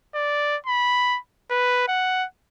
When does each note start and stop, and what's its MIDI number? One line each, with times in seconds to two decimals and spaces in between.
0.15 0.56 74
0.66 1.19 83
1.51 1.86 71
1.88 2.25 78